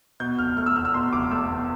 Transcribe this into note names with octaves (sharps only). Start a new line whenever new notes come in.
B2 G6
F1 F6
A3 F6
E6
E2 F6
E6
B2 C6
F1 D6
A3 E6
E2